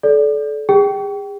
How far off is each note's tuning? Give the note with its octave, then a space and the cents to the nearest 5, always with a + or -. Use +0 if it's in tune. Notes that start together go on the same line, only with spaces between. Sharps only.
A4 -30 D5 -15
G#4 -40 G5 -20